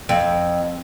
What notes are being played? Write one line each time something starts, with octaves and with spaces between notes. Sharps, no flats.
F2